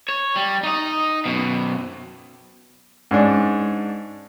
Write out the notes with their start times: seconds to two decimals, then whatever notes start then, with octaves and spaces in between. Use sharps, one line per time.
0.09 C#5
0.36 G3
0.63 D#4 D#5
1.26 F#2 B2
3.11 G#2 C#4 D4